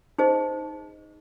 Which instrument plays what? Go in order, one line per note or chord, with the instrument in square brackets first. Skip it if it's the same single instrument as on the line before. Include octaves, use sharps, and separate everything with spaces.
[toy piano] D#4 G#4 C5 D#5